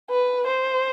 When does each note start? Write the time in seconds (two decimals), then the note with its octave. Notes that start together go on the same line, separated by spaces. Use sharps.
0.10 B4
0.47 C5